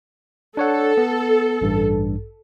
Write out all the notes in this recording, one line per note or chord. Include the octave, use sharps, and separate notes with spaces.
D4 A4 C#5 F#5
B3
A1 G2